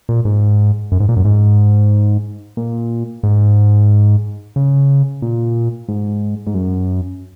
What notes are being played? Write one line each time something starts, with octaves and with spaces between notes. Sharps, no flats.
A#2
G#2
F#2
G#2
A#2
F#2
G#2
A#2
G#2
C#3
A#2
G#2
G#2
F#2